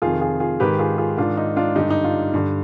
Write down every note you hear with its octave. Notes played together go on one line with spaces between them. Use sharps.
F2 C3 D#3 F4 G#4
F4 G#4
F4 G#4
G#2 D#3 G4 B4
F4 G#4
F4 G#4
G#2 D#3 D4 F4
D#4
D4 F4
G2 D3 D#4 G4
D#4
D4 F4
G2 D3